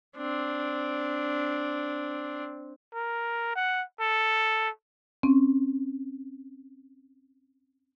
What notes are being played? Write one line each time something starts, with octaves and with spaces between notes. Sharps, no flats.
C4 D4
A#4
F#5
A4
C4 C#4